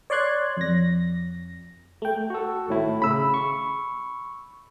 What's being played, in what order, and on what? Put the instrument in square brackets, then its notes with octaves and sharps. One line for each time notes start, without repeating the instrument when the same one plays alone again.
[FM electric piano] C#5 D5 C6 F#6 G#6
F2 A#6
A3 G5
[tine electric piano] F#4 A4
G#1 A2 E4
[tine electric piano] C#3 [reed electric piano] B5 E6
[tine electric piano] C#6